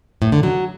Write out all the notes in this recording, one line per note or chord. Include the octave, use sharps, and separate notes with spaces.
A2
D3
F#3